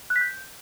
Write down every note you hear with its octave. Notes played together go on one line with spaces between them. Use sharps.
F#6
B6
G6